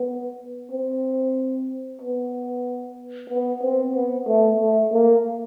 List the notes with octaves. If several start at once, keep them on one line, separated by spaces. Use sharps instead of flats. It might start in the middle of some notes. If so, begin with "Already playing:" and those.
Already playing: B3
C4
B3
B3
C4
B3
A3
A3
A#3